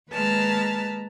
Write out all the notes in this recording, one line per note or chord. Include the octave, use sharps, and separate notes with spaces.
D#2 G#3 B4 A5 A#5 F6